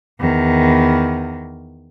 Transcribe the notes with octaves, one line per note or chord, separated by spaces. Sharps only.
E2 D#3